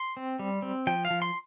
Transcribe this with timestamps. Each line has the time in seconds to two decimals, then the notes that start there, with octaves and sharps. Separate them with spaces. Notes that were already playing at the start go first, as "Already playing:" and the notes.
Already playing: C6
0.17 C4
0.39 G3
0.62 C4
0.87 F3 G5
1.05 F5
1.11 F3
1.22 C6